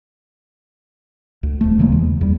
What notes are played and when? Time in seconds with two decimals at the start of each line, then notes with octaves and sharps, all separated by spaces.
1.43 D2
1.61 D#1 D#2 A3
1.79 C#3 E3 G#3 A#3
1.92 E2
2.21 E2 G3